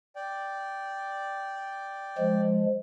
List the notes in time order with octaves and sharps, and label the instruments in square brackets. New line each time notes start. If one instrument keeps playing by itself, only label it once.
[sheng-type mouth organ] D5 G5
[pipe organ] F3 G#3